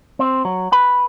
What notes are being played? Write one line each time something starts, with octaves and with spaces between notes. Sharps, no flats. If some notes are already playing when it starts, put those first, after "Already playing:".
C4
F#3
B4